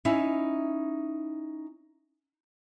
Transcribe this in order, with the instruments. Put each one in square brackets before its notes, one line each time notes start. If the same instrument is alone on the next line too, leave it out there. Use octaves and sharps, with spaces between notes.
[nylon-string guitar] C#4 D#4 E4 E5